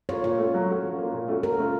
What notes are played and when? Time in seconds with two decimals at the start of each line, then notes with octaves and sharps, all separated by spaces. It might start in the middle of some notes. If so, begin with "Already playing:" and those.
0.09 A#3 F4 C#5
0.24 A#2 C#5
0.38 A3 C#4 F4
0.54 F#3
0.69 A3 C#4 F#4
0.84 F3
0.98 A#3 F4
1.13 A#2
1.28 A3 C#4 F#4
1.43 C#3 A#4
1.58 A3 C#4 F4